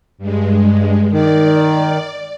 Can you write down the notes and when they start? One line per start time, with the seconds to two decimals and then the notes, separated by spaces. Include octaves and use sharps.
0.18 G2 G#3
1.12 D#3 D5